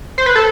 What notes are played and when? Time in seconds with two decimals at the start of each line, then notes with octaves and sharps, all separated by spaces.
0.18 C5
0.26 B4
0.35 A4